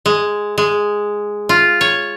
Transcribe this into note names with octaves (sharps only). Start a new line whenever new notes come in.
G#3
G#3
F4
C#5